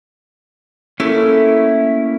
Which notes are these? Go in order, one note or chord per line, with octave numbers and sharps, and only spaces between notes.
A3 A#3 C#4 E4